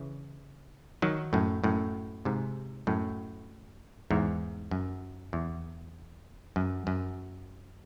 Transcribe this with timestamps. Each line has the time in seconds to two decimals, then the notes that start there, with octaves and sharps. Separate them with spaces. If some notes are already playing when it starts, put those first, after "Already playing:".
Already playing: C#3 E3
1.02 D#3 F#3
1.33 F#2 A2
1.64 F#2 A2
2.25 G#2 C3
2.87 F#2 A2
4.11 E2 G#2
4.71 F#2
5.33 E2
6.56 F#2
6.87 F#2